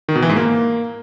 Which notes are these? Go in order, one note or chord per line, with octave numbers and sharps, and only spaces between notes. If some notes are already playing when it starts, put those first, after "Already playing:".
D#3
B2
E3
G#2
A#3